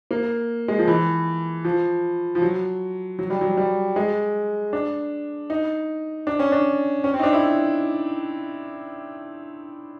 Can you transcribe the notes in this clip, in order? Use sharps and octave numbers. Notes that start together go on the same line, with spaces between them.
A#3
G#3
F3
E3
F3
F3
F#3
F#3
G3
F#3
G3
G#3
D4
D#4
D4
C#4
D4
C#4
C4
D#4
D4
E4